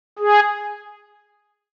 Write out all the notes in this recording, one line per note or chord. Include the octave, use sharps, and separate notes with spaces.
G#4